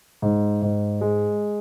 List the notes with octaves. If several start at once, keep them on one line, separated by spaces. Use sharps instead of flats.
G#2
G#2
G#3